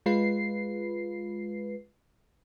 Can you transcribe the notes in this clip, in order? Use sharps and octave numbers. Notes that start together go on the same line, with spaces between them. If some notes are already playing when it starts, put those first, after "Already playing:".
G#3 F4 B4 C7